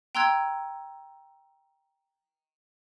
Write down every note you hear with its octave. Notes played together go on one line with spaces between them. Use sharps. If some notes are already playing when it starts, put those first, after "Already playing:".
G5 A#5 C6 E6 F#6 G#6